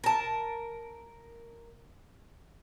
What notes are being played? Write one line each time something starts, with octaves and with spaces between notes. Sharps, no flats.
A#4 A5